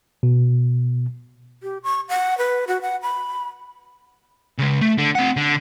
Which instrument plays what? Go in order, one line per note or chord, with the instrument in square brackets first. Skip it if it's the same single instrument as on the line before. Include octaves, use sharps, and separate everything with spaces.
[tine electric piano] B2
[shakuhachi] G4
C#6
F#5
B4
F#4
F#5
B5
[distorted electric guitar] C#3 G#3
A3
D3
C4 F#5
D3